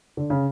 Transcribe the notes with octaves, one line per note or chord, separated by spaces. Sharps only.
D3
C#3